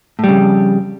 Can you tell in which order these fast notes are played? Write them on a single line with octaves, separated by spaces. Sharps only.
A2 G3 C#3 F2